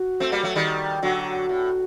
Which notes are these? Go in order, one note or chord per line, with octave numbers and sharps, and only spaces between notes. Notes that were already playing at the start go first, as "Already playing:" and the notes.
Already playing: F#4
A3 C4
G3 A#3
F#3 A3
D#3 G3
D3 F#3 F#4
A2